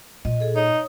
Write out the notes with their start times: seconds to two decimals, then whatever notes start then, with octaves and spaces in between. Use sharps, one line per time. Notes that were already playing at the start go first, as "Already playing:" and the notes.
0.25 A#2 D#5
0.40 G#4 A4
0.56 D#4 C#5 D#6